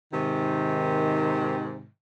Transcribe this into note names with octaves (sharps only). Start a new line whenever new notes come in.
G#2 C3 D#3